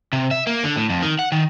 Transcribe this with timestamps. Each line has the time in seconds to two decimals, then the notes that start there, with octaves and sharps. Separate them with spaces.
0.13 C3
0.31 E5
0.47 A#3
0.64 D3
0.77 A2
0.89 F2
1.02 D#3
1.19 F#5
1.32 D#3